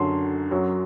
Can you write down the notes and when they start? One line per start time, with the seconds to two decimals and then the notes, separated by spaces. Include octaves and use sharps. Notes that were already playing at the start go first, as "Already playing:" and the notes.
Already playing: F#2 D3 F#3 C6
0.51 F#2 F#3